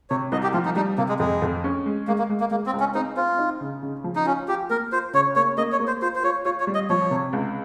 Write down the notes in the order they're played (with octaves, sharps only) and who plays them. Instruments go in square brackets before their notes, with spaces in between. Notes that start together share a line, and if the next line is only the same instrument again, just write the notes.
[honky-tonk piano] C3 [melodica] C#5
[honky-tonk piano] C2 [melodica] D#5
[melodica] G4
[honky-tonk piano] F3 [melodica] F4
[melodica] D#4
[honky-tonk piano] G3 [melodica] D#4
[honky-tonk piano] C3 [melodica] A#3
[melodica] G#3
[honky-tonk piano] F2 [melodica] G#3
[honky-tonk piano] F2
C#4
G#3
[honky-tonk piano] G#3 [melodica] A#3
[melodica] A#3
[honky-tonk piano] G#3
[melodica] A#3
[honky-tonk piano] G#3 [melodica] A#3
[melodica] C4
[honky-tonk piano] C#2
[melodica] C#4
[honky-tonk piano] C4 [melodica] D#4
[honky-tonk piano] C4 [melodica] F4
[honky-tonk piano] D#4
C#3
C#3
F3
[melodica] D#4
[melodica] C#4 [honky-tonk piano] F4
[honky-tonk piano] F4 [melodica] G4
[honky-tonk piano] A#3 [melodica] A#4
[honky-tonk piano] F4 [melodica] C5
[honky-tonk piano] C#3 [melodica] C#5
[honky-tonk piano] A#3 [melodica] C#5
[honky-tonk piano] A#3 [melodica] D#5
[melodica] C#5
[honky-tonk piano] A#3
[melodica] C5
[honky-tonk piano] F4 [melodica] C5
[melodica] C5
[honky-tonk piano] F4 [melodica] C#5
[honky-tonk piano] F4 [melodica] C#5
[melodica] C#5
[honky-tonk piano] G3
[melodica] D#5
[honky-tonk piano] F3 [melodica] C#5
[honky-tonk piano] C3
C#2